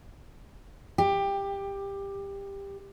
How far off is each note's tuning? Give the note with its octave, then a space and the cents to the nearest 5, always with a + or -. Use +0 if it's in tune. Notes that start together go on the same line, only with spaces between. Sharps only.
G4 +15